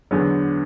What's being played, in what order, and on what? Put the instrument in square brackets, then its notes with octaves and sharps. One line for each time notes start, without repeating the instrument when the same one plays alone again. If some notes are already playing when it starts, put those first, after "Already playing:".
[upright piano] E2 D3 F#3 B3